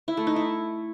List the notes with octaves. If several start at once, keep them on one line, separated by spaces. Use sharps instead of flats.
E4
A3
D#4
E4